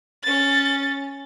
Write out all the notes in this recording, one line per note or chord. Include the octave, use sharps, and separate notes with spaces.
C#4 A6